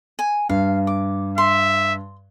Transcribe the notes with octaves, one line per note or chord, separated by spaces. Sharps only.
G#5
G2 F5
D6
E5 C6